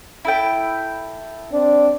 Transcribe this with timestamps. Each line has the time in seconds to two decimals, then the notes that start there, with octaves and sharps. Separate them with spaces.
0.25 E4 A4 G5
1.52 C4 D4 D5